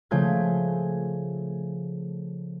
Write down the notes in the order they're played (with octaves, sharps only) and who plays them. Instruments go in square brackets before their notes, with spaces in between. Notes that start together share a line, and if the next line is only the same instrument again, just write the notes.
[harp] C#3 F3 A3 G6 G#6